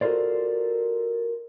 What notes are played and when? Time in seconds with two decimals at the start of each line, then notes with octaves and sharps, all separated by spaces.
0.01 F4 F#4 A4 A#4 C5 D5